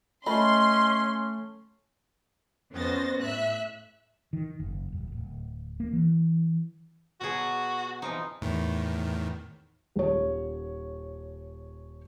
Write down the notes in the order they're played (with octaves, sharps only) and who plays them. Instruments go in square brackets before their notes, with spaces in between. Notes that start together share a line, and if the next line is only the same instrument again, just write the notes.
[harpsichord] A3 [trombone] C#4 [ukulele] D#5 B5 [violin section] C6
[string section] F2 B3 C#4 C5 A6 A#6
A2 E5 F#6
[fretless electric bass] D#3
F#1
D#1
D1
A#3
E3
[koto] B2 F#3 G#4 [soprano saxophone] F#4
[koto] E3 F3 D#4
[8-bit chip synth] E2 A2 D#3
[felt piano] D#1 C#5